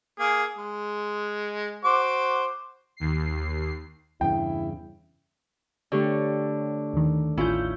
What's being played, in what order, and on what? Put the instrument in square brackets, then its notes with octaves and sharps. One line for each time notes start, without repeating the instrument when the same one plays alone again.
[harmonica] A#3 G#4
G#3
F#4 C5 D6
[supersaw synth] D#2 C7
[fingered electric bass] E2 G2 C#3 [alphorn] E4 [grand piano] G5
[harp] D3 A3 [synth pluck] G4 C#5
[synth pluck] D#2 D#3
[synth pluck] A1 F4 G6 [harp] C#4 E4